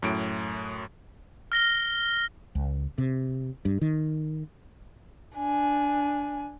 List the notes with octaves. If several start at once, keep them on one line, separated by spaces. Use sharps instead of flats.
F#2 A2 D7
F6 A#6 G7
C#2
C3
G2
D#3
D4 G#5